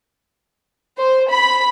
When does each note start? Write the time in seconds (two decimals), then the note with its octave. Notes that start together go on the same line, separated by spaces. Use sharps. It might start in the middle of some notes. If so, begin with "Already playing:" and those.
0.99 C5
1.30 B5